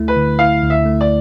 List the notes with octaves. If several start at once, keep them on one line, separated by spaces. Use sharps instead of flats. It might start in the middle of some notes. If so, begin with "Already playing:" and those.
Already playing: D2 A3 E4
B4
D3
E4 F5
D2
E5
A3
D5